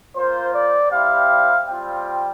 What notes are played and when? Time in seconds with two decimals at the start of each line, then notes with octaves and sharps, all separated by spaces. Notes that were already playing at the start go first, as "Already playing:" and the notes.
0.15 A#3 F4 C5
0.55 D5
0.91 G3 C4 E4 G4 F5
1.68 G3 C4 F4 G5